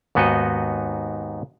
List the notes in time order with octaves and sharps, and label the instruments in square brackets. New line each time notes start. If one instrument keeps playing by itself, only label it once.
[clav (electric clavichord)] D#2 G#2 B3 D#4 F#4 D#5